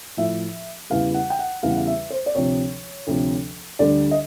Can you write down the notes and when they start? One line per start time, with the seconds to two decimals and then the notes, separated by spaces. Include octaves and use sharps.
0.17 A2 F3 E5
0.90 E2 C#3 E3 G3 F5
1.14 F#5
1.30 G5
1.39 F#5
1.63 E2 C#3 E3 G3 F5
1.70 F#5
1.77 F5
1.87 E5
2.10 C5
2.26 D5
2.35 D2 C3 F3 C#5
3.07 D2 C3 F3
3.79 D2 D3 G3 D5
4.11 D#5